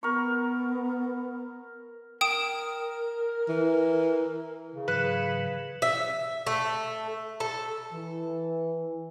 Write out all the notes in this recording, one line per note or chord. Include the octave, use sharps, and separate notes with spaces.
B3 A#4 C#6
A#4 G5 D#6 E7
E3
C#3
G#2 E3 F#3 B4 F#6
E5
A3
A4
E3